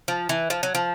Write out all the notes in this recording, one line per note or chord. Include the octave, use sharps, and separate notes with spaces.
F3
E3
F3
F#3
F3